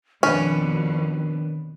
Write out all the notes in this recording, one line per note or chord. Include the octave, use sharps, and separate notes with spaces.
F2 B2 D#3 C#4 D4 B4